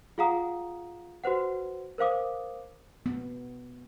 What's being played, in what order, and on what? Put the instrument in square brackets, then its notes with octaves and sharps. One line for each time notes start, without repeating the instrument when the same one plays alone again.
[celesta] F4 G#4 F5 F#5 A#5 D#6
F#4 B4 C5 F#5
A#4 C5 F5 D6 D#6
[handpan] B3